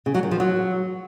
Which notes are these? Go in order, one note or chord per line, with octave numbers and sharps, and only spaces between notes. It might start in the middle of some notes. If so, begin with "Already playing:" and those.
C#3
F#3
D#3
F3
F#3